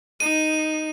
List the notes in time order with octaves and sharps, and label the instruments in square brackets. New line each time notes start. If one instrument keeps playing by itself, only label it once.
[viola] D#4 [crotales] D#7